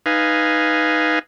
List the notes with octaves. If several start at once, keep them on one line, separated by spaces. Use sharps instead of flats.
D#4 B4 F5 G#5